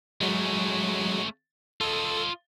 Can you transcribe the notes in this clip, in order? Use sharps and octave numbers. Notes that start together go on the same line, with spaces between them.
F#3 G#3 A3 C#4
F4 A4 D#5